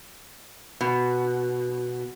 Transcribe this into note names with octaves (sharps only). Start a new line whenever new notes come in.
B2